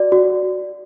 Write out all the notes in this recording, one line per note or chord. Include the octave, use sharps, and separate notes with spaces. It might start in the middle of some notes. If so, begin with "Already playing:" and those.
Already playing: F#4 D5
F#4